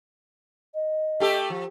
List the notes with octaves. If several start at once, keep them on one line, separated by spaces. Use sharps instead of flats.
D#5
A3 G4 A4
F3